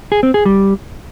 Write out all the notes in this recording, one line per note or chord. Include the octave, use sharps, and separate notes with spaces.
G#4
C4
G#4
G3